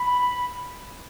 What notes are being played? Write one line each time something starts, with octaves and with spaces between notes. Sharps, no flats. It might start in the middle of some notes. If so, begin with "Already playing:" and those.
Already playing: B5